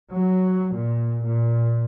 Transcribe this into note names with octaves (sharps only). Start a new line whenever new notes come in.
F#3
A#2
A#2